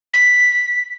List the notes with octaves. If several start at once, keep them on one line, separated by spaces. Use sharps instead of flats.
B6